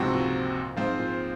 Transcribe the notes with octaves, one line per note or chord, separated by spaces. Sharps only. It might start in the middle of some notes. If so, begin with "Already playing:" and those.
Already playing: C#2 G#2 C3 F3 C4 F#4
A#2
G#2 F3 C4 F4 C5
A#2